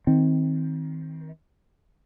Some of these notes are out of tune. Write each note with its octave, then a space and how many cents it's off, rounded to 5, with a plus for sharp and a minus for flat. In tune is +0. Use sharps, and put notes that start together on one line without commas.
D#3 +30 C4 +0